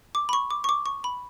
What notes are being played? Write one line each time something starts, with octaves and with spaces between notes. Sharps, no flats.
D6
B5
C#6
D6
C#6
D6
C#6
B5